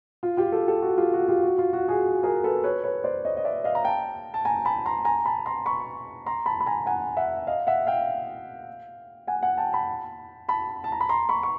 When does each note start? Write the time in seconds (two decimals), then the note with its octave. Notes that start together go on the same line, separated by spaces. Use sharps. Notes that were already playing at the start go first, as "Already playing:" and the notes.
0.23 F4
0.37 F4 G4
0.52 G4 A4
0.68 G4 A4
0.82 F#4
0.97 F4 G4
1.14 F#4
1.28 F4 G4
1.43 F#4
1.58 F4
1.73 F#4
1.88 F#4 G#4
2.23 G#4 A#4
2.44 A4 B4
2.64 B4 C#5
2.84 B4 C#5
3.04 C5 D5
3.24 C#5 D#5
3.37 D#5
3.45 D5 E5
3.64 D#5 F5
3.75 A#5
3.85 G5 A5
4.34 A5
4.45 G#5 A#5
4.65 A5 B5
4.86 A#5 C6
5.05 G#5 A#5
5.25 A5 B5
5.46 A#5 C6
5.66 B5 C#6
6.26 A#5 C6
6.46 A5 B5
6.61 B5
6.66 G#5 A#5
6.86 F#5 G#5
7.17 E5 F#5
7.47 D#5 F5
7.67 E5 F#5
7.87 F5 G5
9.27 F#5 G#5
9.43 F#5 G#5
9.58 G5 A5
9.73 A5 B5
10.48 A5 B5
10.84 A5
10.92 A#5
11.01 B5
11.09 A#5 C6
11.29 B5 C#6
11.43 C#6